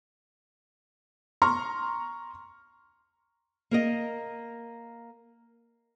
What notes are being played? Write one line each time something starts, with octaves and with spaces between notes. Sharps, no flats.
A#5 C6 C#6 F6
A#3 A#4 D#5